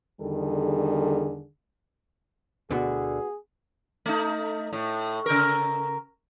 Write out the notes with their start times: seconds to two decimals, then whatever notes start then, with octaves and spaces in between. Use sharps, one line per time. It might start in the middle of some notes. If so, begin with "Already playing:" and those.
0.21 E2 D3 D#3 G3 G#4 A4
2.71 D2 B2 D3 B3 F#4 G#4
4.06 A3 D#4
4.73 A2
5.26 C#3 A#4